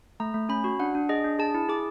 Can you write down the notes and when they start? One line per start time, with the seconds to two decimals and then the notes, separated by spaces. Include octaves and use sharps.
0.20 A3 A#5
0.34 A3
0.49 C#4 B5
0.64 F#4
0.80 D4 F#5
0.95 D4
1.09 G#4 D#5
1.24 D4
1.39 G#4 A5
1.55 E4
1.69 G#4 D6